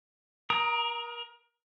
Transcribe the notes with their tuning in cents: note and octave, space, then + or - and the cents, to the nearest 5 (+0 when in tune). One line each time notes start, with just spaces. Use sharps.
A#4 +30 A#5 +0 D#6 +15